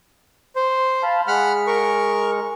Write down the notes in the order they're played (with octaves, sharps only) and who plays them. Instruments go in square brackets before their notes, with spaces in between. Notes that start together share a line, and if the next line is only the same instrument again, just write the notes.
[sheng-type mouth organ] C5
[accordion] F5 A5 B5
[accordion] G#3 [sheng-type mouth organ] F#5 B5 F6
[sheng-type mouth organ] A#4 C#6